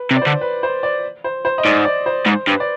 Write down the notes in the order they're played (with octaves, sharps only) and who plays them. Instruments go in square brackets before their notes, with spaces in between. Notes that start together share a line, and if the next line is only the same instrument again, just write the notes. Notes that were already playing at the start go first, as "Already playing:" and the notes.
Already playing: [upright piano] B4
[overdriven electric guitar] C3
[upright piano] D5
[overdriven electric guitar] D3 [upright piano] C5
[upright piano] B4
C5
D5
C5
C5
D#5
[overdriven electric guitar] G#2 [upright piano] D5
[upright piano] D5
C5
[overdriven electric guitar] G#2 [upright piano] C5
[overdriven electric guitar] G2 [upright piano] B4
[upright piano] D5